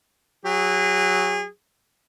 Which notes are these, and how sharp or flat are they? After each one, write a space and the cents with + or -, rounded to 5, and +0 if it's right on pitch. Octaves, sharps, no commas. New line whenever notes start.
F#3 +0 G#4 -30